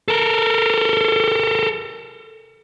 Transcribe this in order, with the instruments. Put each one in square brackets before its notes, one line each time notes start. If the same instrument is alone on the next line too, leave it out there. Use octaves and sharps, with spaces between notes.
[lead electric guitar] A4 A#4